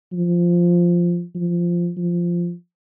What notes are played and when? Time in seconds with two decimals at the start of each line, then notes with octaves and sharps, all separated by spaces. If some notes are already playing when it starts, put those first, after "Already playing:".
0.13 F3
1.35 F3
1.97 F3